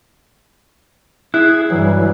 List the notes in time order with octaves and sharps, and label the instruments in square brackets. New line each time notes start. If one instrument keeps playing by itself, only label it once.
[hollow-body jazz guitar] E4 [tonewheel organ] G#4 [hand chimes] F#6
[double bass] G2 G3 [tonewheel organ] E3 F#3